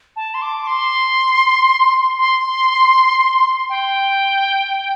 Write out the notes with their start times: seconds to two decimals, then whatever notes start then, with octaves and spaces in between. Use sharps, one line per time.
0.16 A5
0.34 C6
0.42 D6
0.67 C6
2.18 C6
3.69 G5